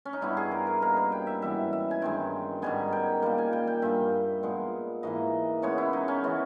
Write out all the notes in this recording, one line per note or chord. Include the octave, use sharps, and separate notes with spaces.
C#4
D#4
G2 G3 B3 E4
G#4
A#4
B4
B2 A#3 A#4
B4
G5
E5
G#2 E3 G3 B3 E5
E5
G#5
G2 D#3 G#3 G5
G#2 D#3 G3 B3 G#5
G5
A#2 G3 A#3 G5
G#5
G5
G5
G2 G3 A#3 E5
A#2 G#3 B3
G#2 E3 A#3 D#5
C#3 G#3 B3 C#5
E4
D#4
C#4
E3 G#3 B3